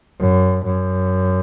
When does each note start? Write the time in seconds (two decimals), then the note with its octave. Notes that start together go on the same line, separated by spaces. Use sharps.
0.20 F#2
0.65 F#2